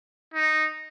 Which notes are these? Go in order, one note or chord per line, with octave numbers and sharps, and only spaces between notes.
D#4